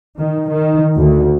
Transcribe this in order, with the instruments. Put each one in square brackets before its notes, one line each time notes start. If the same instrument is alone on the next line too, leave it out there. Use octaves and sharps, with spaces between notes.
[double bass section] D#3
D#3
D2